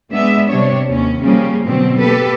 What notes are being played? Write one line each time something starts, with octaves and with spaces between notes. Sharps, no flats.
G#3 B3 D4 E5
C3 G3 D4 C#5
D#2 C#4
C#3 F3 G3 A#3 C#4
B2 D3 F#3 C4
A#3 G4 A4 B4